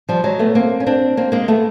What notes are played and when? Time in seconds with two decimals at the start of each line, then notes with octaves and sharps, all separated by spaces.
0.09 F3 G3
0.24 F#3 G#3
0.39 A3 B3
0.55 A#3 C4
0.80 C#4
0.86 C4 D4
1.17 A#3 C4
1.32 G#3 A#3
1.48 A3 B3